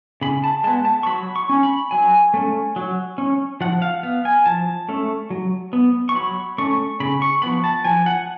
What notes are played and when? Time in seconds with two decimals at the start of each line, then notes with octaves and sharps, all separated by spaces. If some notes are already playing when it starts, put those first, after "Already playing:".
0.21 C#3 B5
0.44 A5
0.64 G#3 B3 A5
0.85 A5
1.03 C#6
1.06 F#3 B5
1.36 C#6
1.49 C#4
1.63 B5
1.91 F#3 G#5
2.34 A3 C#4
2.76 F#3
3.18 C#4
3.61 F3 F#5
3.82 F5
4.03 B3 F5
4.25 G#5
4.46 F3 A5
4.89 A3 C#4
5.30 F#3
5.73 B3
6.09 C#6
6.15 F#3 B5
6.58 A3 C#4 C#6
7.00 C#3 B5
7.22 C#6
7.42 F3 B3 B5
7.64 A5
7.84 F3 G#5
8.06 F#5